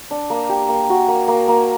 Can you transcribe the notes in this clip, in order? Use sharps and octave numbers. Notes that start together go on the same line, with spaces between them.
D4
A#3
G4
A#3
F#4
A#3
A#3
A#3